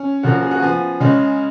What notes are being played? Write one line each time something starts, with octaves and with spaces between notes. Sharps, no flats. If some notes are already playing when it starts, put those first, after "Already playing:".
Already playing: C#4
C#3 F3 A#3 C#4 F#4
G#4
F#4
F3 B3 G#4
C#3 G#3 C#4